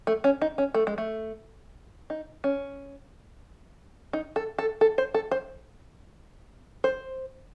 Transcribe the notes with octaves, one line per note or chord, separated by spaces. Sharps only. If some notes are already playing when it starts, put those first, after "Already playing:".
A3
C#4
D#4
C#4
A3
G#3
A3
D#4
C#4
D#4
A4
A4
A4
C5
A4
C5
C5